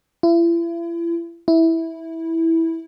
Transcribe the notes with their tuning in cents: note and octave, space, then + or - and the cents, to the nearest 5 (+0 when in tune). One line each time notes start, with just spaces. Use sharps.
E4 +40
E4 -10